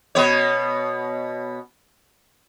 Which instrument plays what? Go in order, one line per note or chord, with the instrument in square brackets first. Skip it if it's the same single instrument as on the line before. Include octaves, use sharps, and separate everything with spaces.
[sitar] B2 B3 C#5